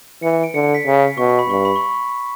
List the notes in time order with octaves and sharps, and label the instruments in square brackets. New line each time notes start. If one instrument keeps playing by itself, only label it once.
[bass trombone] E3 [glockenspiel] C#7
[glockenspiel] D7
[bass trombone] D3 [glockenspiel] C#7
[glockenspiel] C#7
B6
[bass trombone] C#3
[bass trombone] B2 [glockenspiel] C#6
[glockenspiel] B5
B5
[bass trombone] G2 [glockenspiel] C#6
[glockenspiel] B5
C#6
B5